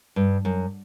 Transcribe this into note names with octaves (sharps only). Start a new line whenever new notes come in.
G2
F#2